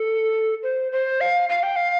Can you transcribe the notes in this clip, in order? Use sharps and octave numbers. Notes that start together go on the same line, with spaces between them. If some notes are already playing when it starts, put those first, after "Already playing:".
Already playing: A4
C5
C5
F5
F5
G5
F5